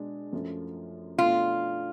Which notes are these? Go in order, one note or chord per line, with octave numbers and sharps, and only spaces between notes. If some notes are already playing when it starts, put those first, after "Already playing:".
Already playing: B2 G#3 D4 G#4
F#2 F3 A3 F4
B2 A3 D4 F4